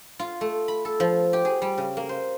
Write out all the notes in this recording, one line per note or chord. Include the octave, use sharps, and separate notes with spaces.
F4
A3
B5
A4
F3
G4
G#4
G3
C#3
A#3
C5